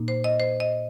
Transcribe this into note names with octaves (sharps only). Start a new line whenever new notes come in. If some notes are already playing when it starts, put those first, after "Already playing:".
Already playing: A#2 A#3 D#4
C5
D#5
C5
D#5